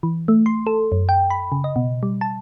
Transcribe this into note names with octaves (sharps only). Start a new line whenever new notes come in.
E3
A3
C6
A4
F#2
G5
B5
C#3
D#5
B2
G3
A5